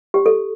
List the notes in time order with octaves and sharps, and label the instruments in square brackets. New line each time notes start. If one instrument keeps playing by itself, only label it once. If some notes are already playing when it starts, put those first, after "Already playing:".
[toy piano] G4
A4